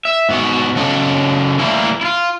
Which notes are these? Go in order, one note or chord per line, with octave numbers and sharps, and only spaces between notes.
E5
G#2 B3 F#4
C#3 F#3 A4 D#5
E3 G3 A3 A#3 E4
E4 F4